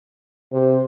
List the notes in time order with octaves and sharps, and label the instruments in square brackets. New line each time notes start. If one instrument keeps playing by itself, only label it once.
[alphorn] C3 [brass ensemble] C5